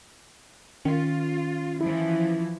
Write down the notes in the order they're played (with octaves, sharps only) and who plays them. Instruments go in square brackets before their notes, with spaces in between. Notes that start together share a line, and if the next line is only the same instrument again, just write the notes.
[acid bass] D#3 [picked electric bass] C#4 [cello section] F4
[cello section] E3 F3 [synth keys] E4